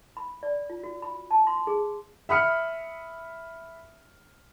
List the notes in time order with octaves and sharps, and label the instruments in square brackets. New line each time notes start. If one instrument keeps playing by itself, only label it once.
[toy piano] B5
D5
F4
F#4
B5
A5
C6
G#4
[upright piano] E5 B5 D#6 F6 C#7